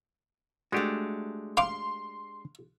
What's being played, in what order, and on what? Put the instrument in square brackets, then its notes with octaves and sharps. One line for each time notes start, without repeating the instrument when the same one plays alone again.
[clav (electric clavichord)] G#3 D4 G4 [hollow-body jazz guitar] A3 F#4
[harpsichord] F5 D6 [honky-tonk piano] C6